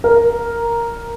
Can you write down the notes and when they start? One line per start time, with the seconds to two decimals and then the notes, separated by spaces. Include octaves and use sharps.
0.04 A#4